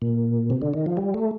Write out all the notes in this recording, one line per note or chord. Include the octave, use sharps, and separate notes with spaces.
A#2
C3
D3
D#3
F3
G3
A3